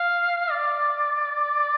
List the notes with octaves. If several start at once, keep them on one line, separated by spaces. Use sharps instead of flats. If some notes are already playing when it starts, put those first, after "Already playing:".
Already playing: F5
D5